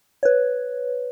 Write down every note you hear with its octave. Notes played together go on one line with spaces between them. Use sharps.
B4 C#5